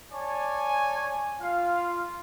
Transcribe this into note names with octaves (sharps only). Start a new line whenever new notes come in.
C#5 D5 G#5 A5
F4 F5